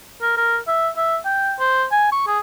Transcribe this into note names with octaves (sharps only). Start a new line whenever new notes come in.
A#4
A#4
E5
E5
G5
C5
G#5
C#6
G#4